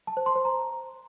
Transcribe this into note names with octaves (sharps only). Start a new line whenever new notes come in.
A5
C5
C6
C5
A#5